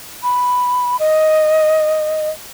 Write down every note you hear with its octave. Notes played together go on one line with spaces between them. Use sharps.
B5
D#5